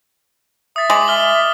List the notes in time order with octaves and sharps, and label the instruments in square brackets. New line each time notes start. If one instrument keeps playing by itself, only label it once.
[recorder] E5 [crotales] D#6 A6
[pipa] G#3 [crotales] D6 D#6 F#7
[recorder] E5 [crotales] F6 G7